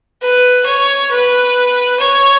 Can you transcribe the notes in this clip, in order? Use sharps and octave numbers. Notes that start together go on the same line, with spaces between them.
B4
C#5
B4
C#5